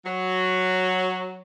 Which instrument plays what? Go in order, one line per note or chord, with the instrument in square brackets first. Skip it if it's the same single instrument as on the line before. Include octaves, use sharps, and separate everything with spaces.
[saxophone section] F#3